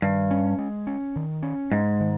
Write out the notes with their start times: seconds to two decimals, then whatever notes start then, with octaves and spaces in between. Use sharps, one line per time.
0.02 G2 D#3
0.31 C#4
0.59 G#3
0.87 C#4
1.16 D#3
1.43 C#4
1.72 G#2 G#3
2.00 D#3